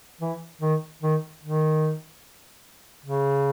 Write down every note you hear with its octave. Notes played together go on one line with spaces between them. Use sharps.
E3
D#3
D#3
D#3
C#3